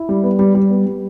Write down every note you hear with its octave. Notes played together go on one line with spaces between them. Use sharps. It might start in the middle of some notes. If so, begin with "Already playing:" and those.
Already playing: E4
G3
B3
G3
G3
B3
G3